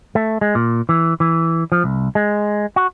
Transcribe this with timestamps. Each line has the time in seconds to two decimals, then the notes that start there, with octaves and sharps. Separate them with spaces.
0.15 A3
0.41 G#3
0.55 A#2
0.89 E3
1.20 E3
1.72 F3
1.84 C2
2.15 G#3
2.76 F#4